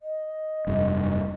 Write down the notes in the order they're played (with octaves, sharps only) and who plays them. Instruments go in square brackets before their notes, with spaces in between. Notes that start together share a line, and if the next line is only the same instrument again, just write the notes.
[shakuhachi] D#5
[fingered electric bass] F1 G2